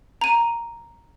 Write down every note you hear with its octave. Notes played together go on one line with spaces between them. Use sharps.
A#5 D#7